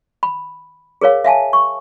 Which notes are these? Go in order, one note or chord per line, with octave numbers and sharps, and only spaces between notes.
B5
G#4 A#4 C#5 F5
E5 F5 G#5 A5
C#6